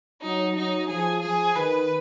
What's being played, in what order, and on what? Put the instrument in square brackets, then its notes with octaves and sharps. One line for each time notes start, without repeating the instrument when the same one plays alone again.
[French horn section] F#3 [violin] D#4
[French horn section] F#3 [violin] D#4
[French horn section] F3 [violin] G#4
[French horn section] F3 [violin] G#4
[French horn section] D#3 [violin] B4